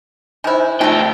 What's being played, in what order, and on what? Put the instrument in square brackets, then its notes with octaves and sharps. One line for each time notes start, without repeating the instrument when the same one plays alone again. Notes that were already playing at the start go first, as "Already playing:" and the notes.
[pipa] D#3 E4 [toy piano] C5 G#5
[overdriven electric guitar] D2 G5 [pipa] D#3 A4 [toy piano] D#4 F4 E5